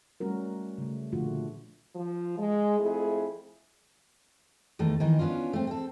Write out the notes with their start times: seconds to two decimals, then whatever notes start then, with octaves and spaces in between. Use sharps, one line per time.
0.20 G3 A3 C#4 F#4 A#4
0.78 C#3 A3
1.12 A#2 D3 F3 A3 F4 F#4
1.95 F3
2.38 G#3
2.79 F2 A3 E4 G#4
4.79 E2 D#3 A3
5.00 D#3 E3 D#4
5.19 B3 C#4 D4 F4
5.53 A3 C4
5.67 C4 A4